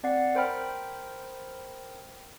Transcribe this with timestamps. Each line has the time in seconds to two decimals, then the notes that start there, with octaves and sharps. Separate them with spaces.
0.03 C4 D5 F#5 C7
0.35 A#4 C5 G5 B5 F6